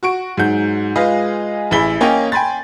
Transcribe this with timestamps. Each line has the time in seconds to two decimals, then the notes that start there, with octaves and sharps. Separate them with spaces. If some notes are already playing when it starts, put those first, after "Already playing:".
0.03 F#4 C#6 D7
0.37 G#2 F#3 F#5 G6
0.96 G#3 F4 G#4 B4 D#5 F5
1.71 A1 E4 G#4 B5 G7
2.01 A#3 C#4 C#5 D#5 G5 G#5
2.32 G5 G#5 B5 C6 A6